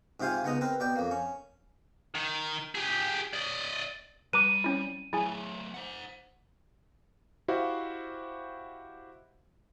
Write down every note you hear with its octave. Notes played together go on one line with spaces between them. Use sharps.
G#2 C3 F4 C5 F5 G#5
C#2 B3 D#4 A#5 D#6
C4 A#4 B4
B2 D5 G5
F2 A#3
C#4
D#3
G4 G#4
D5 D#5
G3 B4 A#5 D6 D#7
C4 C#4 E4
F#3 A3 E4 G#4 G#5
C5 F#5
E4 F#4 G4 C5 D#5 F5